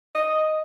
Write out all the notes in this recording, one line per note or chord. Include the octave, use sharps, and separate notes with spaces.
D#5